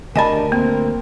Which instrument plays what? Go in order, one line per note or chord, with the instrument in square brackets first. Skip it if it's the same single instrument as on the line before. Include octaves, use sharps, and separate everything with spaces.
[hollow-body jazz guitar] D2 D#5 A5 [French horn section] D4 G4 [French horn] A#4 [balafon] G#5 B5
[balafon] A#3 [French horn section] C4